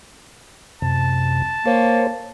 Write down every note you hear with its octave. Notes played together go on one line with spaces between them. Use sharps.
F#2 C3 A5
A#3 A#4 C5 C#5